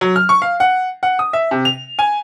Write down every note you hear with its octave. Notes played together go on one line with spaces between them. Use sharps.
F#3
F6
C#6
F5
F#5
F#5
D#6
E5
C3
F7
G#5